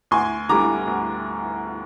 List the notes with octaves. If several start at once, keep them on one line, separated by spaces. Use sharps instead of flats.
D2 G#5 C6
D3 G3 A#5 D6
D2